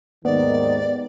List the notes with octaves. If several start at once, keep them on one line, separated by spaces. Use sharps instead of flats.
D#2 G#2 D#3 B3 D5